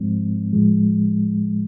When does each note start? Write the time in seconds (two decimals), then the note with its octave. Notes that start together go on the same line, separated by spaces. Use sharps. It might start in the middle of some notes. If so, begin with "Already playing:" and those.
Already playing: G#2 F3 G#3 C4
0.53 A2 F3 G#3